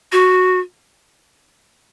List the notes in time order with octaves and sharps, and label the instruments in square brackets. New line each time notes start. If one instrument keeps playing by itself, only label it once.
[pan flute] F#4